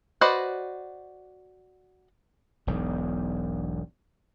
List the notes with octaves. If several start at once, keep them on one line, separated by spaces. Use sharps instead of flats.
F#4 B4 C5 D5 D#5
E1 B1 G#2